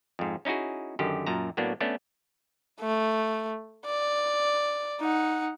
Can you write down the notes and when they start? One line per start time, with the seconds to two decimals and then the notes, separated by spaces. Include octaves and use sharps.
0.19 F2 G#2
0.45 C#4 D#4 E4 F#4 G#4
0.99 F#2 D3 D#3 G4
1.27 F#2 A#2 A5 A#5
1.57 A2 F#3 A#3 B3 D4
1.80 A3 B3 C#4 D4
2.81 A3
3.86 D5
5.00 D#4 F#5